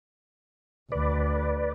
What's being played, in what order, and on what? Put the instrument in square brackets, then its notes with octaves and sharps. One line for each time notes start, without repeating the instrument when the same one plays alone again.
[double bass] D2 [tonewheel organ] B4 D5